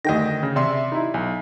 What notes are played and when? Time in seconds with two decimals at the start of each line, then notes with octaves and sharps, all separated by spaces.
0.05 D2 D#3 D#5 G5 A#6
0.43 C#3
0.56 C3 D5 E5 C6
0.92 D#4 E4
1.14 B1 G#5